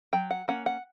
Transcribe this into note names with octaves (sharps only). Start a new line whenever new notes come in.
F#3 G5
F#5
A#3 C#4 F#5
F#5